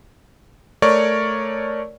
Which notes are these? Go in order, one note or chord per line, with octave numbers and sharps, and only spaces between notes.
A3 A#4 C#5 D5 C#6